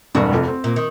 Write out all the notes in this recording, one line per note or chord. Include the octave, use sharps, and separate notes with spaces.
E1 G2 F#4
F1 F2
C4
A#2
D#3